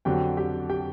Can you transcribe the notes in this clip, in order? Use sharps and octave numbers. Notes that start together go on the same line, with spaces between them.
F2 D3 F#3 G4 G5
G4 G5
G4 G5